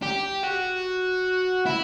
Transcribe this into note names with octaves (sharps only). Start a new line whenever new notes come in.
G4
F#4
E4